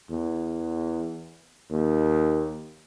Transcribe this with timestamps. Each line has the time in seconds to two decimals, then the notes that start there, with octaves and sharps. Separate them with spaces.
0.10 E2
1.70 D#2